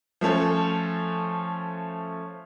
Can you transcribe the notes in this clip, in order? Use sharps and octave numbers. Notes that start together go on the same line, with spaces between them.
F3 A3 C#4 A4